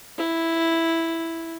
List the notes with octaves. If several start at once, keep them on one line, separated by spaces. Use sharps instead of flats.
E4